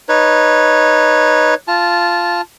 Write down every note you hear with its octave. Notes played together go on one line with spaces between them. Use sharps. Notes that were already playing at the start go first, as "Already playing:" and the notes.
D#4 B4 C#5
F4 A5